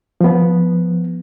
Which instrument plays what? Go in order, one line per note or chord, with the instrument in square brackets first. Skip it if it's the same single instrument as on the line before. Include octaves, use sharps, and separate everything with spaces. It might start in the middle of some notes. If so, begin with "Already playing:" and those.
[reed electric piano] F3 B3